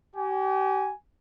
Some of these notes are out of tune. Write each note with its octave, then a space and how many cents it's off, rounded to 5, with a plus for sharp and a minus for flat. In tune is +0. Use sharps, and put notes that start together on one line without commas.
G4 -35 G#5 +0